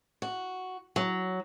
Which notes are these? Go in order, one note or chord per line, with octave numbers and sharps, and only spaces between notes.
F#4
F#3